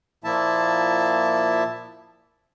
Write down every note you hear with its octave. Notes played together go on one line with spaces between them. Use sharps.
A#2 F3 A#3 E4 E5 A5